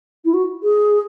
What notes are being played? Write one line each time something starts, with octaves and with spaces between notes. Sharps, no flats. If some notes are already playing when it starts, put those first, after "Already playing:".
E4
F#4
G#4